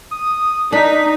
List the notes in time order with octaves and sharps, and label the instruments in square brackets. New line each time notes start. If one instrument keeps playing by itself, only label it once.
[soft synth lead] D#6
[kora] D4 [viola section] D#4 [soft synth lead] B6